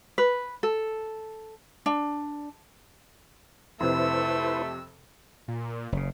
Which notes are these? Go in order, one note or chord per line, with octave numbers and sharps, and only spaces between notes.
B4
A4
D4
F2 C3 A3 E4 B4 C5 E6
A#2
F#1 C#3